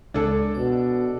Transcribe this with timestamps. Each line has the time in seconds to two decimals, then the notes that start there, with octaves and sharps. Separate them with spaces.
0.14 C#2 G#3 D4 A4
0.54 B2 D5